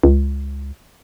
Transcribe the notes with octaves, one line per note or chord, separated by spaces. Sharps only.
C#2